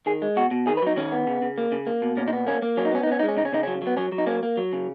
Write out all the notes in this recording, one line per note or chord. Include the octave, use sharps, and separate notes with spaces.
D#3 G#4
G#3
B2 F#4
B2
D#3 G#4
B4
F#3 D#4
D#3 C#4
B3
C#3
C#3
A#3
C#3
A#3
B2
A#2 C#4
D#4
B3
A#3 C#4
A#3
F#3 C#4
D#4
B3 C#4
D#4
B3
C#4
G#3 D#4
C#4
C#3 D#4
C#4
C#3 D#4
F#3 C#4
F#3 B3
F#3 C#4
F#3
D#4
A#3 C#4
A#3
F#3
C#3